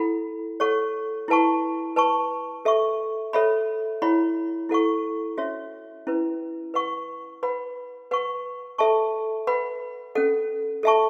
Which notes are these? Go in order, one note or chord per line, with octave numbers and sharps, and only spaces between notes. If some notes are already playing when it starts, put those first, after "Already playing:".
Already playing: E4 A4 F#5 B5
A4 C#5 F#5 C#6
E4 B4 F#5 A5 C#6
B4 A5 C#6
A4 E5 C#6
A4 C#5 E5 B5
E4 C#5 F#5 B5
E4 A4 F#5 C#6
C#4 F#4 C#5 E5
C#4 E4 B4
B4 F#5 C#6
B4 F#5 B5
B4 F#5 C#6
A4 E5 A5 C#6
B4 F#5 B5
C#4 A4 F#5
A4 E5 A5 C#6